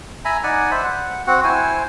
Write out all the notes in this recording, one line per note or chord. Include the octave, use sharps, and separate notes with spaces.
E5 G#5 A#5 B5
D#4 D5 F#5 G#5
C5 E5 B5
F#5
C4 F#4 F#5
E4 C5 G#5